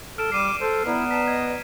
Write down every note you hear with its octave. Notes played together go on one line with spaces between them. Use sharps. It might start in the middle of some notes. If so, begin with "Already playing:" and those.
A4 F6 D7 E7
G3 D6 C7 D#7 E7
A4 C5
B3 E4 B4 D5 A#5
A5 B6 E7
D#5 G#6